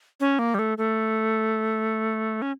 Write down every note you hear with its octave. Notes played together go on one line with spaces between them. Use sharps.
C#4
A#3
G3
A3
A3
C#4